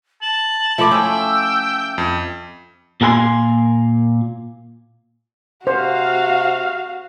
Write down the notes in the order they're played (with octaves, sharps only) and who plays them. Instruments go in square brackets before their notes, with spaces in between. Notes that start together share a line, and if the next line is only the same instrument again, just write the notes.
[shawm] A5 [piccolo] F#7
[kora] F3 A3 E4 [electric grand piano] E5 D6
[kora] C#4 [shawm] G5 [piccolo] E6
[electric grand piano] F2
[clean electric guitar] A#2 A#3 G#4 A#4 G#5 C6
[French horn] C3 [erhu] F#4 [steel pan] C5 [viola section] F5